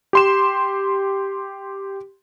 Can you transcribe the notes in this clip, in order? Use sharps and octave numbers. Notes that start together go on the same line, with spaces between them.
G4 C6 E7